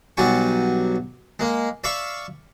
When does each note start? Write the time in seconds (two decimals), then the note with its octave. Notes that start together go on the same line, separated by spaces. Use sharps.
0.17 B1 F#3 G3 D5 G#5 C#6
1.40 G#3 A#3
1.84 D5 E5 F5 B5 C#6